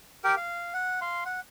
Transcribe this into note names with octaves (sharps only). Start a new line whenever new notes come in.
G4 A#4 G5
F5
F#5
F5 C6
F#5